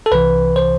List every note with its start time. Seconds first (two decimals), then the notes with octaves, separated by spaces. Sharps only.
0.06 A4
0.12 C2 C3 E3 B4
0.56 C5